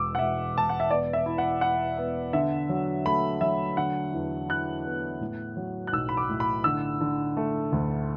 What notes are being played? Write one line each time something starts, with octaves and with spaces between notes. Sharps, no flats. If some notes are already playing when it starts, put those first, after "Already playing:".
Already playing: E1 E2 D6 E6
F#5
E1 E5
E1 A5
F#5
E5
B3 D5
E5
E4
F#5
E4 F#5
B3
D3 E5
F#3
A3 B5
F#3 E5
D3 F#5
E2
E4 F#6
B3
A2
F#3
F#6
B1 E6
B5
D6
A2
B5
D3 E6
D3
A3
D2